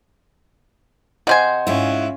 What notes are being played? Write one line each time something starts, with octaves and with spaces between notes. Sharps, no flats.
C3 C5 D#5 F#5 G#5
G#2 C#4 E4 F4